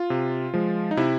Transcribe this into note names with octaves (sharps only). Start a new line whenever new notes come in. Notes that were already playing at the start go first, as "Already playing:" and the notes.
Already playing: F4
C3
F3 G#3
D#4
C3 E4